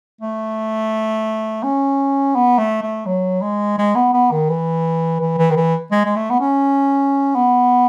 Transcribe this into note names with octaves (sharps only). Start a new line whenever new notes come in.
A3
C#4
B3
A3
A3
F#3
G#3
G#3
B3
B3
D#3
E3
E3
E3
D#3
E3
G#3
G#3
A3
B3
C#4
B3